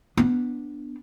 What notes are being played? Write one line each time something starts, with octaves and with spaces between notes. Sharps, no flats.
B3 D4